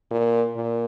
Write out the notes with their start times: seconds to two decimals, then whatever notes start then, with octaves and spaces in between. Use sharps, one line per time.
0.11 A#2
0.56 A#2